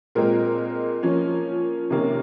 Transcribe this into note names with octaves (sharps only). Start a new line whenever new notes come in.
A#2 G#3 C4 A#4
F3 A#3 C#4
C3 D#3 A#3 C#4